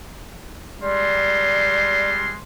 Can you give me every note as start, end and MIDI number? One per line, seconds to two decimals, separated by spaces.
0.82 2.37 55
0.82 2.37 56
0.82 2.09 74
0.82 2.37 84